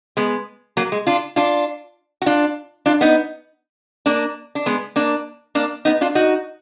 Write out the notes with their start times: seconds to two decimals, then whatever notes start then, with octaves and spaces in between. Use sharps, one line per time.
0.17 G#3 B3
0.77 F#3 A#3
0.92 G#3
1.07 D4 F4
1.36 D4 F4
2.22 F#4
2.26 D4 F4
2.86 D4 F4
3.01 B3 D#4
4.06 A#3 D4
4.55 D4
4.66 G#3 B3
4.96 A#3 D4
5.55 A#3 D4
5.85 B3 D#4
6.01 D4 F4
6.15 D#4 F#4